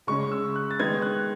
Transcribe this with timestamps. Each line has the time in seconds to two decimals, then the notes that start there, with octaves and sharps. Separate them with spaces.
0.07 C#3 G#3 C#4 C#6
0.32 E6
0.56 F#6
0.71 A6
0.79 D#3 G#3 B3 D#4 G#6
1.02 F#6